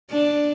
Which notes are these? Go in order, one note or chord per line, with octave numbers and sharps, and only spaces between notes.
D4